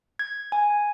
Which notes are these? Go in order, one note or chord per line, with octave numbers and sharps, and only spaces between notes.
G#6
G#5